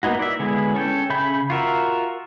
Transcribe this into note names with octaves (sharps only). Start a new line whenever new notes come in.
A#3 B3 D#4 E4 F#4
D5 E5
D3 G#3 B3 E4 G#4
C#4 A4 G5
C#3 E5 B5 G6
F4 F#4 A#4 E5